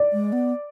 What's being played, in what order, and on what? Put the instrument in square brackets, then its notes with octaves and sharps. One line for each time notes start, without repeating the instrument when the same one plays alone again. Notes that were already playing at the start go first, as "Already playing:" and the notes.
Already playing: [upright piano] D5
[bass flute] G#3
B3